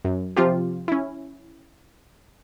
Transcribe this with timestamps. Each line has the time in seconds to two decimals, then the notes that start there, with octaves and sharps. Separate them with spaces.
0.05 F#2
0.36 C3 F3 C4 F4 G4
0.88 C#4 E4